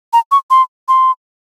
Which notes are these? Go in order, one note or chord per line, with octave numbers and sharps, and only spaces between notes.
A#5
C#6
C6
C6